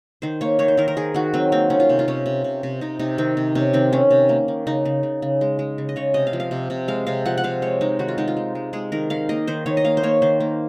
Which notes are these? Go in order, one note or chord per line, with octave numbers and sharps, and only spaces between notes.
D#3 C5
A#3 C#5
D#3 C#5
C5
D#3 A#4
A#4
D#3 G#4
D#3 F#4
F#3 C4
A#3 C4
D#3 C#4
F4
C3
F4
C3 C#4
C3
C3
C3
C3 D#4
C3 D#4
D#3 C4
C3
C3 C#4
D#3 C4
D#3 C#4
C3
A#3
D#3
C#3 D#4
C#3
C#3
C#3
G#3
G#3
C#3
D#5
C#3 C#5
C3 D#5
F5
F3
F5
C3
C3
G#3 F5
C3 F5
F3 F#5
F#5
C3 F5
G#3 C#5
G#3 D#4
D#3 F#4
F4
G#3 D#4
F4
G#3
G#3
G#3 G#4
D#3 A#4
D#3 F5
A#3 D#5
D#3 C5
D#3 C#5
D#5
A#3 F5
C5
A#3 C#5
D#3 C5
A#3